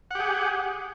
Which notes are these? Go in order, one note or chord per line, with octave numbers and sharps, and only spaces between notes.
G4 G#4 F#5